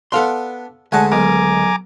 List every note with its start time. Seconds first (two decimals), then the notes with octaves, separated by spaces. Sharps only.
0.12 B3 D4 A4 F5 C6
0.92 D2 G#3 A3 F#5 G#5 A5
1.12 B1 D#3 G#5 A#5 D6